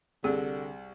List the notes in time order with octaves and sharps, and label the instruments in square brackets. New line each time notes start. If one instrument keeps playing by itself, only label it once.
[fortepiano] C2 [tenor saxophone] D3 [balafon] G#4